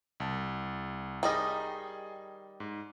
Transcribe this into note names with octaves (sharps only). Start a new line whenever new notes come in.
C2 A5
D#3 G3 G#4 D#5 A#6
G#2